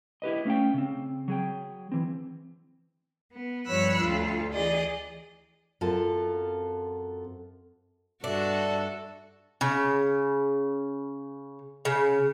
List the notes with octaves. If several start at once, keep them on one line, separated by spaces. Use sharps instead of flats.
E4 G4 B4 D#5
A3 C#4 F5 G5
C#3 C4
F#3 G#4 G5
E3 C4
B3
G2 F3 C#5 B5 E6 F#6
D2 F4
E3 G#4 D5 D#5
F#2 C4 F4 A4 A5
G2 D4 F#4 A4 E5
C#3
C#3